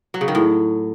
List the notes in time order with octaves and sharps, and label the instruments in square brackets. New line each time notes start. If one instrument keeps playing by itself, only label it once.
[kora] F#3
C#3
D#3
A2